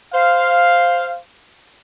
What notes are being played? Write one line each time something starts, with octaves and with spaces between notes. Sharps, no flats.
C5 F5